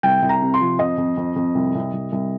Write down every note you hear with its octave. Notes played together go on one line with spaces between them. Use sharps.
C2 G5
C2
A#5
C3
C6
F3
F2 D#5
F2
F2
F2
C2
C2
C2
C2